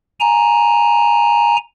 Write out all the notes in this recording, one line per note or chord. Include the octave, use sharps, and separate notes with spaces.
G#5 A#5